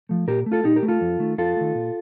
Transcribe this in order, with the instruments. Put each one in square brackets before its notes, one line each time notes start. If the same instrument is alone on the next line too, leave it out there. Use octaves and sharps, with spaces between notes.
[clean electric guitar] F3 A3
A#2 G4 A#4
A3
F4 A4
A#2 D#4 G4
G4 A#4
A3
F4 A4
F2
D#3 A3
F2 F4 A4
D#3 A3
A#2